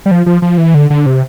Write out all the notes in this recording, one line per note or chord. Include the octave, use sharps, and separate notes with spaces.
G3
F3
F3
F3
E3
D3
D3
C3